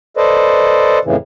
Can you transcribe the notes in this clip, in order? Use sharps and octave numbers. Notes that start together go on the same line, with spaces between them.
A4 B4 C5 D5 D#5
F2 A2 C#3 E3